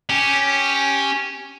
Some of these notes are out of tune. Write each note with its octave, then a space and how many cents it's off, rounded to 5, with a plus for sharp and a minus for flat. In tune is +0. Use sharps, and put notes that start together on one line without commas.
C#4 +0 G4 +0